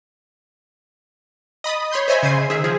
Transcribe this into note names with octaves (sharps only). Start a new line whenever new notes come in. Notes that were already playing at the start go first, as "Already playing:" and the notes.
D#5 B5 D#6 A6
C#5 B5 C6 G6
C5 C#5 D#5 E5 G#5 B5
C#3 C5 G#6 C7 D#7
D#3 G#4 E5
F3 G#4